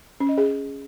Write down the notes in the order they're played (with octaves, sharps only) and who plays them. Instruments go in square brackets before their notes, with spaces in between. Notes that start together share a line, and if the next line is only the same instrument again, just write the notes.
[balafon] C#4
D#5
G#4